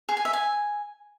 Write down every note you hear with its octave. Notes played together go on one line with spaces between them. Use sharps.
G#4
G#5
E5
G#5